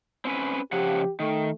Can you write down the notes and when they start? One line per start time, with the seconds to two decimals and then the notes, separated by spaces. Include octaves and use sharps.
0.25 C4 C#4 B4
0.72 C#3 F3 G4 F#5
1.20 D#3 A3